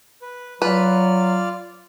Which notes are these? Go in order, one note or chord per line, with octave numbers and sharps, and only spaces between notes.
B4
F#3 F4 B4 D5 F6